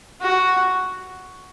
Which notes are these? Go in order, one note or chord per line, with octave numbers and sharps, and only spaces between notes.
F#4